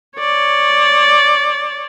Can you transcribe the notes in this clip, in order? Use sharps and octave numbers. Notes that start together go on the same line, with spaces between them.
C#5 D5